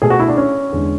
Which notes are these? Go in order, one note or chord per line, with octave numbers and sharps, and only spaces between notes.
B2 A3 G#4
F#4
E4
D4
C#4
E2 D3 G#3